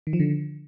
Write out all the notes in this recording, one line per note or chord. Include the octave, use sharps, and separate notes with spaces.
D#3
F3
D3